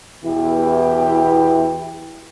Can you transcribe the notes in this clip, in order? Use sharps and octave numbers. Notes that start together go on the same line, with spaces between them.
E2 B2 E3 E4 G4